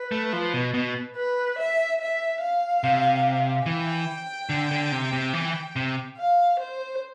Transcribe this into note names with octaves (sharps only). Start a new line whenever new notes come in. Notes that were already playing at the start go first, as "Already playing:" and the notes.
Already playing: B4
A3
F3
B2
B2
B4
E5
E5
F5
C3
E3 G5
D3
D3
C3
C3
E3
C3
F5
C5